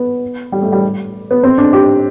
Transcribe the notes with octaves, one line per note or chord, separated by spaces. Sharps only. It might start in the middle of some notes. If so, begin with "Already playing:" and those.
Already playing: B3
G3
A3
G3
B3
C4
D4
G4